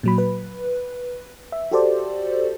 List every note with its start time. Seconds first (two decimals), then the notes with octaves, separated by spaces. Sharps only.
0.03 A#2 F#3 B5
0.18 B4
1.52 E5
1.71 F#4 G4 A4 C5 D5